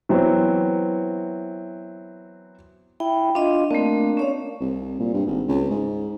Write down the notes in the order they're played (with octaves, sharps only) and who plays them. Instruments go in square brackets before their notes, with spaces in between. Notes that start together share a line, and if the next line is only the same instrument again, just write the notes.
[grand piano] E3 F#3 B3 C4
[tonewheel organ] E4 [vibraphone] G5
[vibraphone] D4 D#5 [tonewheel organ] F4
[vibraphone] A3 C4 [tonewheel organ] A#3 D4
[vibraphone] C#4 C#5 F5
[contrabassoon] C2
A#2
G2
G#1
C#2
G#2